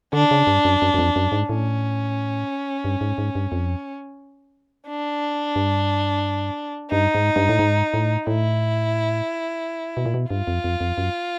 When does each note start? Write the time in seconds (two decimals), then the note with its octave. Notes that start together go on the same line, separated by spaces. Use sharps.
0.13 D3 D4
0.31 C#3
0.47 G2
0.65 F#2
0.82 F#2
0.94 F#2
0.99 F2
1.16 F#2
1.32 G#2
1.49 A2 C#4
2.85 G2
3.01 G#2
3.18 G#2
3.35 G2
3.52 F2
4.88 D4
5.56 G2
6.91 G2 D#4
7.15 G#2
7.36 G2
7.49 A2
7.59 G#2
7.94 A2
8.27 A2 E4
9.97 B2
10.06 A#2
10.14 B2
10.30 G2 F4
10.47 F2
10.64 F2
10.81 F2
10.98 F#2